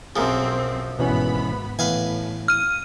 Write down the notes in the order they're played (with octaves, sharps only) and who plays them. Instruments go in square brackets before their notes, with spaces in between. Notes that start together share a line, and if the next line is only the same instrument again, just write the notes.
[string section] B1 C4 [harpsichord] F#2 F3 [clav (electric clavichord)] G#4 A#4
[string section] G#1 B3 B5 [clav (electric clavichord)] B2 E3 C#4
[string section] A2 [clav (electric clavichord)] E3 B3 [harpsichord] B4 F5 G#5
[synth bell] F6 D#7